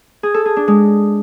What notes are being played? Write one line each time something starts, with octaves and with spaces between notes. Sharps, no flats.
G#4
A4
G#4
D4
G#3